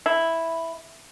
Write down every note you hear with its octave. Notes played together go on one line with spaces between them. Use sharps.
E4